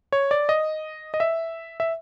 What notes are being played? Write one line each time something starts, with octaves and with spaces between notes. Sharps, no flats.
C#5
D5
D#5
D#5
E5
E5